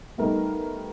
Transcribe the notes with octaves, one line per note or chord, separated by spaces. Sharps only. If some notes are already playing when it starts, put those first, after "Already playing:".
G3 A3 B3 D#4 A#4